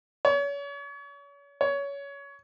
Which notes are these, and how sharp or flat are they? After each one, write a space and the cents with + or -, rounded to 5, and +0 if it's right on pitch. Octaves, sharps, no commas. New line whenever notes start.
C#5 +35
C#5 +20